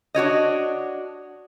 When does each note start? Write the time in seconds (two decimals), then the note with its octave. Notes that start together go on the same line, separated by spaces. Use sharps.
0.15 D4 F#4 C#5 D#5